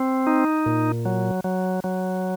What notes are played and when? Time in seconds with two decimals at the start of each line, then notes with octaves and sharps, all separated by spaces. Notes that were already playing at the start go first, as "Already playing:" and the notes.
Already playing: C4
0.27 D#4
0.66 A#2
1.05 F#3
1.44 F#3
1.84 F#3